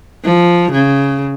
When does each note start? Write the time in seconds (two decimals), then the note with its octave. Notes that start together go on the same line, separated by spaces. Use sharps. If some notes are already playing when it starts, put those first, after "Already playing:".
0.24 F3
0.72 C#3